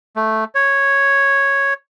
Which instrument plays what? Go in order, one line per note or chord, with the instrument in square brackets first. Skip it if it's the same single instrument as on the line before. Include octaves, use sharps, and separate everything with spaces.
[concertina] A3
C#5